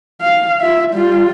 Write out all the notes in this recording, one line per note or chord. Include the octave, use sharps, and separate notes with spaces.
F5
F4 E5
G3 F4